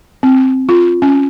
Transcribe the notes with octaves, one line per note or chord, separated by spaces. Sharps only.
C4
F4
C#4